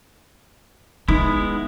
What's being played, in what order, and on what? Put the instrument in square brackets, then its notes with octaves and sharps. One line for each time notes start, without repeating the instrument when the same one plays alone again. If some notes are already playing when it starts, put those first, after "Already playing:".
[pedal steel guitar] G#3 B3 E4 [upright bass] D#4